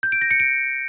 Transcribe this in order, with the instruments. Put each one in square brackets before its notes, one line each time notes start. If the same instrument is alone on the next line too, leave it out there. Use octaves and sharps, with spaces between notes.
[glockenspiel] G6
D7
A#6
C#7
D7